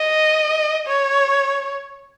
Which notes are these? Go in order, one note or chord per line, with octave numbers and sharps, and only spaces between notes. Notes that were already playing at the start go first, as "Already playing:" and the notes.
Already playing: D#5
C#5